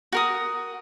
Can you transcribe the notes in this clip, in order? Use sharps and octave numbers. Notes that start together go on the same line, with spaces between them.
F#4 A#4 D#6